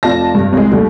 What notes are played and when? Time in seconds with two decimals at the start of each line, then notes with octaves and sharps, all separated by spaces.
0.03 F1 F4 D5 A5 A#6
0.35 G2
0.53 C2 G#3
0.72 D#2 G3 A3